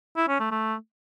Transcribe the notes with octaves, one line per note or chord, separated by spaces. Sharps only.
E4
C#4
A3
A3